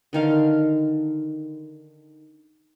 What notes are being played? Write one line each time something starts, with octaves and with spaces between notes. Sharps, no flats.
D3 D#3 F5